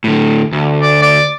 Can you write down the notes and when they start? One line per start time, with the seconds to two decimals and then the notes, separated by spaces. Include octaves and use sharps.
0.04 A2 D3
0.52 D2
0.82 D5
1.02 D5